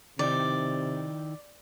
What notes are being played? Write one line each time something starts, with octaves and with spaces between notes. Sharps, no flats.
C3 D#3 D#4 E4 D5